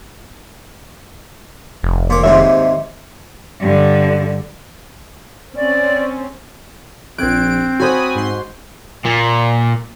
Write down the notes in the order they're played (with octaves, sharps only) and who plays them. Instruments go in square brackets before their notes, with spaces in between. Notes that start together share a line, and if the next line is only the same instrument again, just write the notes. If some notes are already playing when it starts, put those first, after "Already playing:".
[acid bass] F1
[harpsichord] A#2 D6
[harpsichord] D#2 G#2 C3 [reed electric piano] E5
[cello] G2 D3
[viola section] C4 C#4 [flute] D5
[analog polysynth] A#1 D7 [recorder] C4 [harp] F#6 G#6
[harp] F#4 C5 E7 [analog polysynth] G#5 B5 D#6
[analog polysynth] G#2 C6
[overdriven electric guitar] A#2